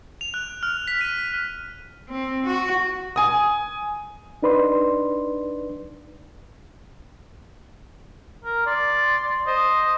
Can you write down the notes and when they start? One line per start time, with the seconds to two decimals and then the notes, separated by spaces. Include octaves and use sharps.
0.21 F7
0.34 F#6
0.63 F6
0.88 B6
1.01 D#7
2.10 C4
2.46 F#4
3.16 G#5 D#6
4.43 D4 D#4 B4 D5 C6
8.45 A#4
8.67 D5 C6
9.47 C5 D#5